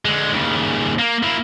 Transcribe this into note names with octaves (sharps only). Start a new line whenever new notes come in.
D3 G#3
D#2 C#3
A#3
A#3 E4